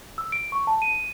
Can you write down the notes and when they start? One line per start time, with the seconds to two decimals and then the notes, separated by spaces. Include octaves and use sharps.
0.18 E6
0.32 D7
0.52 C#6
0.67 A5
0.82 D#7